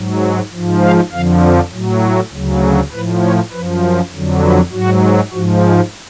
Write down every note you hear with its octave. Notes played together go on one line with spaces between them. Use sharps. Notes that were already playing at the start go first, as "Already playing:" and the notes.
Already playing: G#2 F#3
G#2 F3
F5
F2 D3 F3 F5
A2 F#3
D2 C#3 F#3
A2 F3 B4
C#5
F#2 F3 B4
F2 D3 F#3
B4
G#2 F#3 F#4
G#2 F3 F#4
G#4